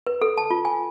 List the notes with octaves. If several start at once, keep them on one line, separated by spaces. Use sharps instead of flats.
B4
A4
A5
F4
G#5